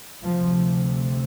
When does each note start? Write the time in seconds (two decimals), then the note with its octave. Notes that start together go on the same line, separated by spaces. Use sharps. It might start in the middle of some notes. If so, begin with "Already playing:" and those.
0.22 D2 C3 F3